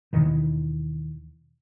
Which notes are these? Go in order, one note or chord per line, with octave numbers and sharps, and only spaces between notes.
D#2 B2 D#3 E3